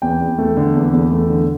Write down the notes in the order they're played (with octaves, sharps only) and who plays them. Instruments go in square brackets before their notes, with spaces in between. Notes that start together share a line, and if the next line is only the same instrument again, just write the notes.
[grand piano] E2 G5
E2
A3
D3
E2
E2
A3
D3